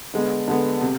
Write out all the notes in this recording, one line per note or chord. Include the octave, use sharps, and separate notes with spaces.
D3 G#3 B3
D3 G#3 B3
C3